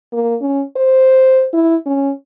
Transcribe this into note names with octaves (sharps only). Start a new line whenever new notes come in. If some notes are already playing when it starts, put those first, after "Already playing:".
A#3
C#4
C5
E4
C#4